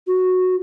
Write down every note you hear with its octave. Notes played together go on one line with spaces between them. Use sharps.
F#4